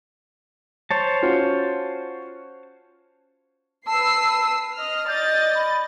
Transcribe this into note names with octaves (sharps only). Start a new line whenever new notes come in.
C5 C#5 A5
C#4 F4 F#4
B4 A5 E6 C7
D#5 F6
D5 D#5 G6 A6
B5